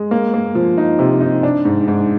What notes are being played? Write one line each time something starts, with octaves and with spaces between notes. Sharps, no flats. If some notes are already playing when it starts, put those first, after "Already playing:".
Already playing: G#3
A#3
A#3
F3
D#4
C3
D#4
D4
G#2
G#2